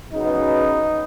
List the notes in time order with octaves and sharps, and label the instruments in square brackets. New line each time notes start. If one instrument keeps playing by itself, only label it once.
[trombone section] C#3 F#3 B3 D#4